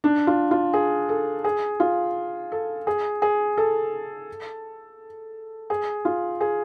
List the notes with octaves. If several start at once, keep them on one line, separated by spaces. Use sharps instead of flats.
D4
F4
F4
G#4
A4
G#4
F4
A4
G#4
G#4
A4
G#4
F4
G#4